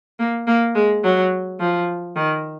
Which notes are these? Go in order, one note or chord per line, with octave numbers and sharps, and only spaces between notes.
A#3
A#3
G#3
F#3
F3
D#3